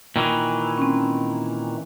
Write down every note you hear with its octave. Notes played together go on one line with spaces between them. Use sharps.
A#2 D#3 E3
C4 C#4